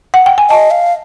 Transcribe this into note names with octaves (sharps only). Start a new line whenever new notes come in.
F#5
G5
G#5
D#5 A5
F5